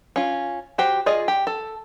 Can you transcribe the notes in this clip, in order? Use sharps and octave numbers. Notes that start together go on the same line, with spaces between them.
C#4 F4
F#4 G4 C5
F4 G#4 D5 D#5
G4
A4